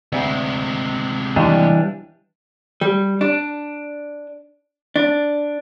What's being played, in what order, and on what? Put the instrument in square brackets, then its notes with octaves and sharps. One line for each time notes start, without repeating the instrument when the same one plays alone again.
[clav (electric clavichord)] D2 [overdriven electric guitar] C3 G#3
[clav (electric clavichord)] D#2 [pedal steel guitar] E3 G3 D4
[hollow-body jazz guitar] G3
D4
D4